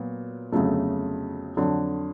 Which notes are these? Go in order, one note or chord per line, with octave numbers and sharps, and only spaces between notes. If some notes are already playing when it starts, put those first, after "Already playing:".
Already playing: A#2 F#3 B3
G1 F2 C#3 F#3 A3
F2 D3 F#3